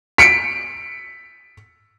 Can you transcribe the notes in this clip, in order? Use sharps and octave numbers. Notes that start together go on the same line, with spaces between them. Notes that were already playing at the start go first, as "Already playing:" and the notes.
B6 C#7 D7